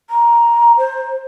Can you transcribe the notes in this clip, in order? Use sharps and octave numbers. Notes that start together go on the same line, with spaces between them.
A#5
C5